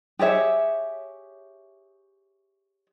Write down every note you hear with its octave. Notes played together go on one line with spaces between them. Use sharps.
G4 G#4 C#5 E5